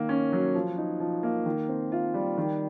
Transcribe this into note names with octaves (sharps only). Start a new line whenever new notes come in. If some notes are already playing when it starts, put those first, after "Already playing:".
Already playing: D#3 A#3
C#4
F#3
F3
D#4
F3
A#3
D#3
C4
F4
G3
D#3